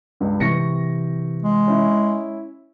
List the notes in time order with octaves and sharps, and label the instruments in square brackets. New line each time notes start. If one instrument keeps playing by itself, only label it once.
[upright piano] C#2 G2
[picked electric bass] C3 E3 [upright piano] C#6 A#6 C#7
[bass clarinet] G#3
[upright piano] C#4 E4